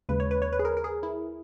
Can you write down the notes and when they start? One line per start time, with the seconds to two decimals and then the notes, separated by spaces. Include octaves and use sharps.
0.09 D#2 C#3 G#3 B4
0.20 C#5
0.31 B4
0.42 C#5
0.53 B4
0.59 G#4
0.65 A#4
0.77 A#4
0.84 G#4
1.03 E4